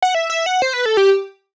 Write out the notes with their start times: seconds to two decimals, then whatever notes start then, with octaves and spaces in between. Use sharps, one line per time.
0.02 F#5
0.15 E5
0.30 E5
0.46 F#5
0.62 C5
0.74 B4
0.86 A4
0.97 G4